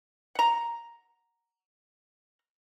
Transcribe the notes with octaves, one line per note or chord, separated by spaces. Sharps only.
F#5 A#5